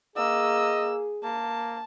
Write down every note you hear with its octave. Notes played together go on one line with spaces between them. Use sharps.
A#3 G#4 D#5 E6
A#3 A5